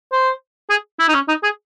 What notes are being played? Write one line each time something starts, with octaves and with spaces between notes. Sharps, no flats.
C5
G#4
E4
D#4
C#4
D#4
G#4